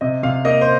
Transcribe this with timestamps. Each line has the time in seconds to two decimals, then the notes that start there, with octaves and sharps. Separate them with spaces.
0.01 C3 D#5
0.23 C3 F5
0.45 A#3 D#5
0.61 C5